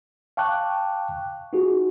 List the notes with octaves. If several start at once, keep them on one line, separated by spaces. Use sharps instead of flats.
F5 G5 A5 C#6 D6 F#6
D#4 F4 F#4 G#4